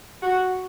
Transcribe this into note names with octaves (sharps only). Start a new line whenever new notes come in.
F#4